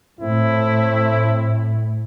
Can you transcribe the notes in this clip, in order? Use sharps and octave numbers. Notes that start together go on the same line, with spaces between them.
A2 A3 C4 E4